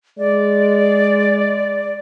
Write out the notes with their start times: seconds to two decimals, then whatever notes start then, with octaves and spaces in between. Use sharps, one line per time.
0.18 G#3 D5